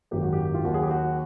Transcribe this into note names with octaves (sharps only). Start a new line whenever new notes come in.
G#1 F#2 D#3 F#3 A#3 G4
F#4
G4
F4
D#2 D#3 F#3 F#4
G#4
G4
F#4